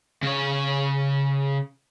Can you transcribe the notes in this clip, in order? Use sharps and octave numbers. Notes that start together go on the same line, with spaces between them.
C#3 C#5